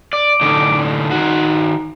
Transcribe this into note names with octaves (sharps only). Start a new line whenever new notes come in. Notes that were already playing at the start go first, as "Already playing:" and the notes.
D5 D6
A2 D3 D#4
D#3 D#4 F#4